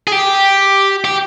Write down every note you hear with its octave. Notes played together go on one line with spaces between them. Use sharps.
G#4
G4
G4